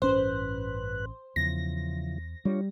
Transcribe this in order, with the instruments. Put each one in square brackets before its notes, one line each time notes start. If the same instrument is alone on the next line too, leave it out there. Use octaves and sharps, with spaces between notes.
[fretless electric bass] A1 C#4 [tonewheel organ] G2 B4 F#6 [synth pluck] C5
[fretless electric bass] E2 [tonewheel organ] C#3 E3 F3 [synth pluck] A#6
[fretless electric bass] G3 [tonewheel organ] D4 F4 C#5